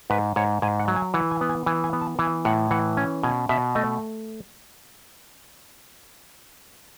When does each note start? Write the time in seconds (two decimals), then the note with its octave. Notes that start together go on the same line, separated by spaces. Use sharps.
0.10 G#2 B4
0.36 G#2 C#5
0.62 G#2 G#5
0.80 F#5
0.88 F#3
0.96 G#5
1.14 E3 F#5
1.31 G#5
1.41 B3
1.49 G#5
1.66 E3 G#5
1.84 G#5
1.93 B3
2.01 A5
2.19 E3 G#5
2.45 A2 F#5
2.71 E3 F#5
2.97 C#4 G#5
3.23 B2 G#5
3.49 B2 E5
3.75 A3 D#5